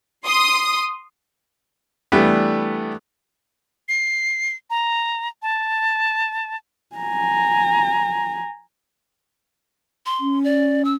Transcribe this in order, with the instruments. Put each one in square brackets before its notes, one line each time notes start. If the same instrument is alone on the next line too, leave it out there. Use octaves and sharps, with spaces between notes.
[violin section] C6 D#6
[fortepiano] E3 G3 A3 B3 D4
[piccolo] C7
A#5
A5
[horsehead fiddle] G#5 A#5
[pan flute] C6
[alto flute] C#4
[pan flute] D5
E6